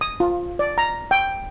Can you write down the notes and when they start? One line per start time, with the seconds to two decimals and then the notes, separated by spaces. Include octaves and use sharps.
0.01 D#6
0.20 F4
0.59 D5
0.78 A#5
1.11 G5